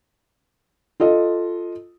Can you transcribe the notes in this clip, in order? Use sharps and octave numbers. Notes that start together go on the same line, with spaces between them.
F4 A4 D#5